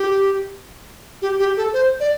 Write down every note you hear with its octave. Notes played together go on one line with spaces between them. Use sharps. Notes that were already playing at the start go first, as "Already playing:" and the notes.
Already playing: G4
G4
G4
A4
C5
D5